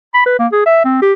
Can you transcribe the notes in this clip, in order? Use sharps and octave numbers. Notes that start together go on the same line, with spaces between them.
B5
B4
A#3
G#4
E5
C4
G4